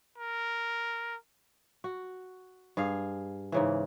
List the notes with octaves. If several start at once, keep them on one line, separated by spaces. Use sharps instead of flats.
A#4
F#4
G2 G#4 F5
G#2 C#3 E3